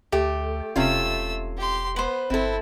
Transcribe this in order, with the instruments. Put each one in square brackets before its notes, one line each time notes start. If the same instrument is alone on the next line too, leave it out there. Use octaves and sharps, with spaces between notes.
[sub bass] D2 [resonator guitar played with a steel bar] A3 [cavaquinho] G4
[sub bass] E1 [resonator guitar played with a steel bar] C3 C#4 F4 [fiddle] A3 E6
[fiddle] G4 C6
[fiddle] B3 [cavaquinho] B4 C5
[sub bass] G1 [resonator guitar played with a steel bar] C4 A4 [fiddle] E4